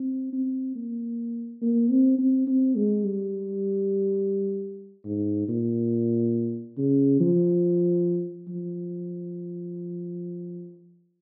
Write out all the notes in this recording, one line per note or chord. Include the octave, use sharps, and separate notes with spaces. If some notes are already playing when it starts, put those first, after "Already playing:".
Already playing: C4
C4
A#3
A#3
C4
C4
C4
G#3
G3
G#2
A#2
C#3
F3
F3